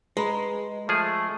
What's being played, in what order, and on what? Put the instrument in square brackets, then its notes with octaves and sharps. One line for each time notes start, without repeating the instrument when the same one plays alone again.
[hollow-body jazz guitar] G#3 [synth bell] B4 A#5 B5
[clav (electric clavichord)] F3 G#4 [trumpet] A3